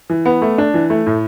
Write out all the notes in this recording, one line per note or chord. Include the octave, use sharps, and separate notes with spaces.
E3
B3
A3
D4
E3
A3
A2